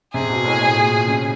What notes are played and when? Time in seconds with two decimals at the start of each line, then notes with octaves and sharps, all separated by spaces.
0.14 C3 G#4
0.30 B2
0.45 A2
0.61 A2
0.76 A#2
1.07 C#3